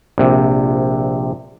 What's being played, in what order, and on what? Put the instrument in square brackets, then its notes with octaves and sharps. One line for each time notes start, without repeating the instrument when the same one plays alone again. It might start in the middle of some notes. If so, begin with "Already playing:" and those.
[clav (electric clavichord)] A#1 C3